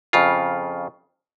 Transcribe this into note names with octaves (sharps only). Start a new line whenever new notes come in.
F2 C#3 F4